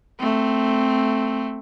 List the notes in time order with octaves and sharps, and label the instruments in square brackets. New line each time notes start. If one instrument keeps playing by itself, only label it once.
[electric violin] A3 C4